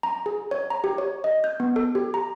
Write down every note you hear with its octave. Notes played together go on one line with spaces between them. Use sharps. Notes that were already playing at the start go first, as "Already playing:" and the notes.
A#5
G#4
C#5
A#5
G4
C#5
D#5
G6
B3
A4
G4
A#5